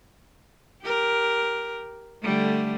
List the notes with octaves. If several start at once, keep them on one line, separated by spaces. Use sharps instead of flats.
G4 A#4
D3 G3 A3